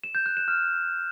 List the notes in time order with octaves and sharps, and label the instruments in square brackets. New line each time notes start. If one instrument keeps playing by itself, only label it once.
[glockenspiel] E7
G6
F#6
E7
F6